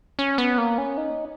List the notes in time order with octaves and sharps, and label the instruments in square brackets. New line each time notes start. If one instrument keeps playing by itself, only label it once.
[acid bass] C#4
B3
A#3
C#4
D#4